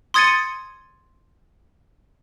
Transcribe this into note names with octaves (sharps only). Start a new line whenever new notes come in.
C6 D#6 G#6 A6 C#7 D#7